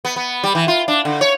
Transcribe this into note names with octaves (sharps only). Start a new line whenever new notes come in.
B3
B3
G3
E3
F4
D4
D3
C#5